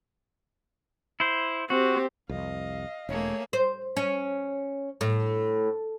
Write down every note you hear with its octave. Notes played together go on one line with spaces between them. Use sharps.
E4 C5
C4 F#4 G4
C2 F2 D#5 F5
E1 A3 A#3 G#4 C#5
C5
C#4
A2